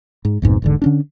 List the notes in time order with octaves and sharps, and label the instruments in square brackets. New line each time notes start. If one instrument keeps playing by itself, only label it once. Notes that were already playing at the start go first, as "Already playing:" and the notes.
[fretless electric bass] G#2
A#1 F2 G#2 B2
E1 G#2 D3
D3 C#4 D4